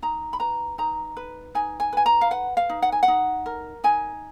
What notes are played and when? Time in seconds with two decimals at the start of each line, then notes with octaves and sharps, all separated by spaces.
0.02 D#4 A#5
0.33 B5
0.40 B4 A#5
0.78 D#4 A#5
1.17 B4
1.55 D#4 G#5
1.80 G#5
1.93 B4 G#5
2.06 A#5
2.21 F5
2.31 B4 F#5
2.57 F5
2.69 D#4
2.82 F#5
2.92 G#5
3.03 F#5
3.08 D#4
3.46 A#4
3.84 D#4 G#5